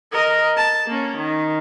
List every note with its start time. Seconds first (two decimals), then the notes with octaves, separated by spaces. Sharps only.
0.12 A#4 D#5
0.57 A5
0.87 A#3 C#4
1.17 D#3